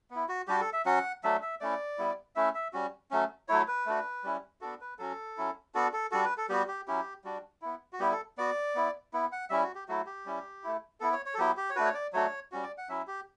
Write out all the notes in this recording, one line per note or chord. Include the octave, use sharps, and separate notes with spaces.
B3 E4
F#4
G3 D4 F#4 G4
A4
E5
F#3 C#4 F#4 F#5
F#3 A3 D4 E5
E5
A3 C#4 E4 D5
G3 B3 E4
A3 C#4 E4 E5
E5
G3 C#4 F#4
F#3 A3 C#4
F#3 A3 E4 C#5
B4
A3 D4 F#4
G3 C#4 E4
B3 D4 F#4 A4
B4
F#3 C#4 F#4 A4
F#3 C#4 E4
B3 D4 F#4 A4
A4
G3 D4 F#4 A4
B4
A4
G3 B3 F#4 G4
G4
F#3 C#4 E4 G4
G3 D4 F#4
B3 E4
F#4
G3 B3 E4 G4
A4
B3 F#4 D5
B3 E4
B3 E4
F#5
G3 C#4 E4 E5
F#4
G4
F#3 A3 E4 F#4
G4
G3 C#4 E4
A3 E4
B3 E4 A4
C#5
C#5
A4
F#3 B3 E4 G4
G4
C#5
A3 D4 F#4 B4
C#5
D5
F#3 A3 D4 F#4 C#5
G3 C#4 F#4
D5
F#5
F#3 C#4 E4 E5
G4